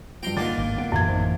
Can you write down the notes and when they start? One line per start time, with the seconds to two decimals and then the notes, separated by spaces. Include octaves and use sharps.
0.23 G2 F3 G5 A#5 C6
0.37 D3 D#3 A#3 F4 F#5 D6 A6
0.57 G#1 D3
0.78 F3 B3 F#5 D7
0.92 D1 F#2 A#2 D3 E3 G#6
1.08 A1 D#4 C5